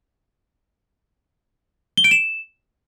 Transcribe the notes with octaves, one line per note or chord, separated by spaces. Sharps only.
G7
D7
E7